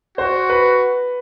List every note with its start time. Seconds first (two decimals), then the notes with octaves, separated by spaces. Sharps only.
0.18 F#4 C5
0.50 B4